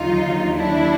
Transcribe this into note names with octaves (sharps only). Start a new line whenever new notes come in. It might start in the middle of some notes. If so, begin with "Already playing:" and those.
Already playing: D#2 D3 F#3 D#4 F4
D4 E4